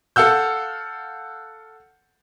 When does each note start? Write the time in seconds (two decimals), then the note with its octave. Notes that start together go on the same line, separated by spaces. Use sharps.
0.16 A4 F5 F#5 E6 G6